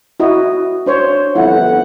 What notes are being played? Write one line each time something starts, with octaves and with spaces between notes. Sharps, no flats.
E4 F#4 D#5
D4 C5 C#5
G1 F2 E4 F#5